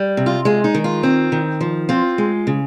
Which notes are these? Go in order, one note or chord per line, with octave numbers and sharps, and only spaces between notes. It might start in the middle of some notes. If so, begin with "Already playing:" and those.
Already playing: G3
C3
F4
G#3 F4
D#4
D#3
F4
C4
D#3
F3
C4 F4
G#3
C#3